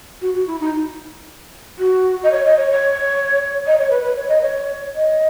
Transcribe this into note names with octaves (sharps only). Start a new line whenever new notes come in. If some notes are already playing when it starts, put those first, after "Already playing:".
F#4
F#4
E4
D#4
F#4
D#5
C#5
D#5
C#5
C#5
D#5
C#5
B4
B4
C#5
D#5
C#5
D#5